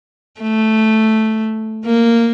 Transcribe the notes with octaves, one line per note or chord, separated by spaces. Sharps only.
A3
A#3